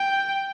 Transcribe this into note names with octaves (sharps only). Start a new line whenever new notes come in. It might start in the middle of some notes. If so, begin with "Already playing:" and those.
Already playing: G5